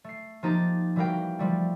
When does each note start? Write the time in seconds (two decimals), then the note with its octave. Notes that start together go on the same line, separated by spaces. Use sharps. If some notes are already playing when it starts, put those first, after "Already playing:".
0.04 A3 C7
0.43 F3 A#3 D#4 G4 A#5 A6
0.96 E3 G3 F#4 A#4 F5 G5
1.39 F3 G3 A3